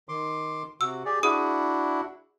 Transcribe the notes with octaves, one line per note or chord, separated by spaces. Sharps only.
D#3 C6 D6
C3 F#4 E6
G4 G#4 D5
D4 E4 F#4 G#4 D#6